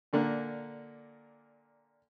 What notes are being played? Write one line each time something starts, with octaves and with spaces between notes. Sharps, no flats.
A#2 D3 A#3